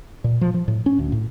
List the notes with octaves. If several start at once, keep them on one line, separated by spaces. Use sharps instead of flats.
A#2
F3
F3
A2
C#4
D2
A2